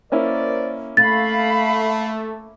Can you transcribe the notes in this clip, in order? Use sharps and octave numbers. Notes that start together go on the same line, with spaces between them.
A#3 C#4 E4 A#4 C5 D5
A3 F5 B5 A6